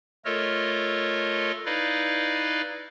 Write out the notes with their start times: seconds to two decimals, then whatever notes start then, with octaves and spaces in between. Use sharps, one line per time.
0.25 A3 F4 A4 A#4 C#5 D#5
1.65 D#4 E4 B4 D5 D#5 F5